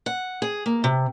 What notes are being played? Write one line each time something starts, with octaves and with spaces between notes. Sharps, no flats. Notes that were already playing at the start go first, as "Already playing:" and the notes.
F#5
G#4
A#3
C3